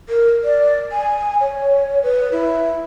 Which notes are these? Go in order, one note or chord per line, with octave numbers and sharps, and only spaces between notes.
A#4
D5
G#5
C#5
B4
E4